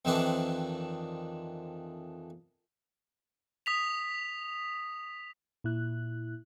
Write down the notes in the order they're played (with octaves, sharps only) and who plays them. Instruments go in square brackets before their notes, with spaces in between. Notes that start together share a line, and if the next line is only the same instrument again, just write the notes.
[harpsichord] F2 D#3 E3 C4 D4
[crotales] D#6 B6 F7
[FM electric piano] A#2 E4 F#6